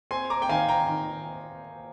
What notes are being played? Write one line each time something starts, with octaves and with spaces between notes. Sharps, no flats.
C4 G#5 C6
A#5 D6
G5
D#3 F5 G#5
G5 A#5
D#3